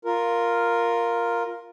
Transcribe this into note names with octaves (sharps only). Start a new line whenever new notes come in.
F4 A#4